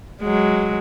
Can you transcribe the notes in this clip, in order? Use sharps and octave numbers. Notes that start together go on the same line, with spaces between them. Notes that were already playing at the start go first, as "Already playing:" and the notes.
F#3 G#3